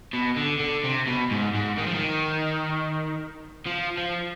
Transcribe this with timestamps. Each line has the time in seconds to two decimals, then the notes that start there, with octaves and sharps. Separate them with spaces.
0.14 B2
0.37 D3
0.60 D3
0.84 C3
1.07 B2
1.31 G#2
1.55 G#2
1.78 D#3
1.87 F3
1.94 D#3
3.66 F3
3.98 F3